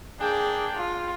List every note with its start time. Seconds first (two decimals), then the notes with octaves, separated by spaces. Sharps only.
0.20 A#3 D4 G#4 G5
0.76 F4